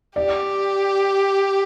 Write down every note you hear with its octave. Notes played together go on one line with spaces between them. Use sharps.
G4 D5